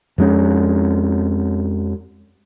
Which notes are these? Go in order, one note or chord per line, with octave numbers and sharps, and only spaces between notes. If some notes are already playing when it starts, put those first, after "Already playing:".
F2 G#3 C#4